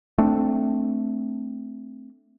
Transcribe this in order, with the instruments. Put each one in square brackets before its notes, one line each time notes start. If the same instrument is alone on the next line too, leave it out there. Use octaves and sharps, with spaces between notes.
[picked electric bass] A3 C4 D4